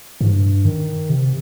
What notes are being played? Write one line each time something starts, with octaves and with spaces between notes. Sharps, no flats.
G2
D#3
C3